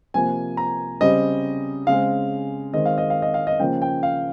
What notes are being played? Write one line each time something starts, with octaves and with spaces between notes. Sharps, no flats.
C3 F3 A#3 G#5
A#5
C#3 G3 C4 D#5
C#3 G#3 C4 F5
D#3 G#3 C4 D#5
F5
D#5
F5
D#5
F5
D#5
C#3 F3 A#3 G5
G5
F5